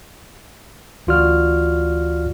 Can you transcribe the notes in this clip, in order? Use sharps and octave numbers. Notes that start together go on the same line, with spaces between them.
D2 E3 F4 F#4 D5 F6